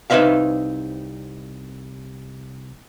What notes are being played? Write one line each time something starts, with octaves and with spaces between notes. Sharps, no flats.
C2 D#4 B4 C5 E5 F5